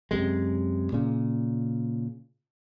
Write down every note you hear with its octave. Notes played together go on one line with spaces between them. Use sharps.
F#2 C3 G#3
A#2 C#3